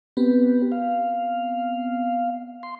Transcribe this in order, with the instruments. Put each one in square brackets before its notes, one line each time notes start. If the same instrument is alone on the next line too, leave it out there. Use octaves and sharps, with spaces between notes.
[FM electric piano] B3 C4 [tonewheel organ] G4 B4
[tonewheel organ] F5
C6